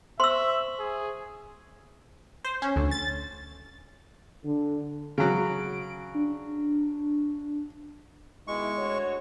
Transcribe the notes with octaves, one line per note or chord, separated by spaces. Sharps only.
C5 E5 C6 C#6 E6 F#7
G#4
C5
C#4
D2
A6
D3
C#3 F#3 D7
D4
B2 D#3 G#3 E4 C#6
D2 F#4 C#5